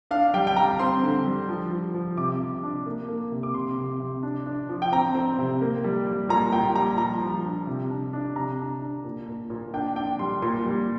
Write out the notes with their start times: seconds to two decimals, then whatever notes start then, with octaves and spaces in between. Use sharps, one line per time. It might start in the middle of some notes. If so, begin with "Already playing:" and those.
0.11 D4 F5
0.34 G3 G5
0.47 G5
0.56 G3 A#5
0.79 C4 C6
1.03 D3
1.26 G3
1.49 F3
1.71 F3
1.95 F3
2.17 C3 D6
2.40 C3
2.63 D4
2.86 A#3
3.08 A#3
3.32 C3
3.43 D6
3.54 C3 C6
3.78 C3
4.00 C3
4.23 D4
4.46 D4
4.69 F3
4.82 G5
4.92 C4 A#5
5.15 C4
5.39 C3
5.61 A#3
5.84 G3
6.07 G3
6.29 A#2 A#5
6.52 A#2 G5
6.75 G3 A#5
6.98 F3 A#5
7.22 F3
7.45 D4
7.67 C3
7.90 D4
8.13 D4
8.36 C3 A#5
8.59 D4
8.82 D4
9.04 A#2
9.28 A#2
9.50 A#2
9.74 D4 G5
9.96 D4 G5
10.19 G3 C6
10.42 A#2 C6
10.65 G3